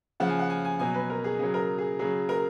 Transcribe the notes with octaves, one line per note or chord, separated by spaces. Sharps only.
C#3 F3 F#5
G#5
F#5
G#5
G#5
B2 F#3 G#5
B4
A#4
G#4
C#3 F#3 G#4
A#4
G#4
C#3 F#3 G#4
A#4